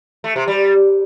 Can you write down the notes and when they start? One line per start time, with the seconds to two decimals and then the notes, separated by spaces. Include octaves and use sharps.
0.24 A3
0.36 C3
0.48 G3